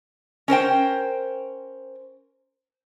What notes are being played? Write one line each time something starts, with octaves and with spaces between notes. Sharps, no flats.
C#4 A#4 C5 G5